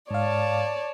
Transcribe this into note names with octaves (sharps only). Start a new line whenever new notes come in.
G#2 C#5 D5 F5 A5